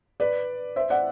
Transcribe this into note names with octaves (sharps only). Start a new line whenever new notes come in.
B4 D5
C5 E5
D5 F#5